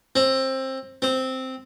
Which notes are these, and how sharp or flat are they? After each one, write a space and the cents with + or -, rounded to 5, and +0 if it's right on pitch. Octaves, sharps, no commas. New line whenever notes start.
C4 +20
C4 -5